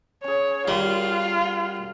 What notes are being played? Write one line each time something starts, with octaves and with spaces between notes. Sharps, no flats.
C#4 G#4 C#5
G3 F4 F#4 A#4